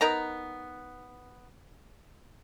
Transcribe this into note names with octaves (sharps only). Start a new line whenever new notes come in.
B3 D#4 A#4 A#5